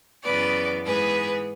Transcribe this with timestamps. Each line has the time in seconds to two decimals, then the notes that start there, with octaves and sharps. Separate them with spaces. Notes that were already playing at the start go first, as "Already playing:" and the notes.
0.23 F#2 C#3 E3 B3 B4 D5
0.85 G#2 E3 B3 G#4 B4